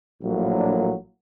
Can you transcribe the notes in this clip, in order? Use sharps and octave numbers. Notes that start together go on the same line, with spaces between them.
A#1 A2 F#3 A#3
D4